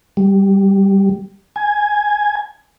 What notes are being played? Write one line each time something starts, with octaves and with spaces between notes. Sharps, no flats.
G3
G#5